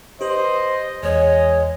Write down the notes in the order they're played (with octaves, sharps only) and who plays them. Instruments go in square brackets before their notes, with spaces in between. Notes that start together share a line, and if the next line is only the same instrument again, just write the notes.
[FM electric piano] G4 B4 [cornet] C5 [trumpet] D#5
[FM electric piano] E2 [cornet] G#3 [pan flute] C#5 [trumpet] D#5